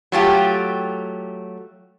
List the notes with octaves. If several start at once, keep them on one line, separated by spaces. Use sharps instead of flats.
F#3 A3 F4 G4